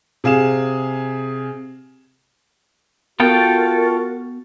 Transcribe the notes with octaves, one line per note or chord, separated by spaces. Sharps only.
C3 G#4 F5 E7
B3 F4 F#4 A4 A#4 G5